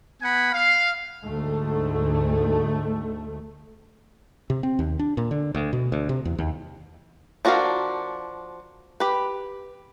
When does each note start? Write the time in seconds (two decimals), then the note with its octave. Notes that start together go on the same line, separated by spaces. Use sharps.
0.22 B3 F#5 G#5 B5
0.53 F5
1.23 D2 G#2 A3
4.50 C3
4.63 C4
4.79 D#2
4.99 D4
5.17 A#2
5.31 D3
5.55 D2
5.73 B2
5.92 D2
6.09 C3
6.25 E2
6.38 D#2
7.45 F3 D4 F#4 A#4 F5
9.00 G4 B4